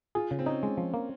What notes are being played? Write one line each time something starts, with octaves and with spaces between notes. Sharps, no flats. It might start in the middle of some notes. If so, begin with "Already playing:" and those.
F4 G#4
C#3
C4
C#4 D#4
G#3
F3
A#3